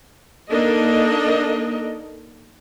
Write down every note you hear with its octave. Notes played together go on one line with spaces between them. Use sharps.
A#3 D4 D#4 A4 D#5